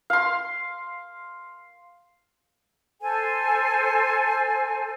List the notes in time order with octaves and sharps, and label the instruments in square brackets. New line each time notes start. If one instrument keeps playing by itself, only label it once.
[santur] F5 C6
[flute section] A4 C5 G#5